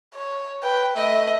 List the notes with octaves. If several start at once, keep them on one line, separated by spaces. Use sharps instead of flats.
C#5
B4 G5
A3 D#5 E5